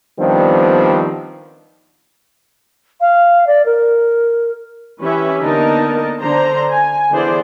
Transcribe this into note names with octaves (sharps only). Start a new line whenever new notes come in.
D#3 F3 G3 B3 C4 D4
F5
D5
A#4
E3 C#4 G4 B4 C#5 E5
D3 A#3 B3 D#4 A#4 A5
D3 D4 C5 A#5
G#5
D3 E3 B3 G#4 C5 D5